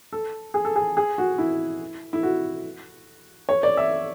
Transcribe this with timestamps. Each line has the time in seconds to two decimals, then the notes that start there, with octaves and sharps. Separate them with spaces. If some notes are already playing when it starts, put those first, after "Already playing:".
0.13 A4
0.54 G#4
0.65 A4
0.76 G#4
0.97 G#4
1.18 F#4
1.38 E4
2.13 E4
2.23 F#4
3.49 C#5
3.63 D5
3.77 E5